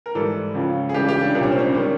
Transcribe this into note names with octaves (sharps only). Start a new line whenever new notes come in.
A#4
G#2 E3 G3 A4
C#2 C#3 F3
G#4
C#2 C#3 E3 G3 G4
G4
D4
C2 A#2 G3 D4
C#4
C4
C#4
D#3 G3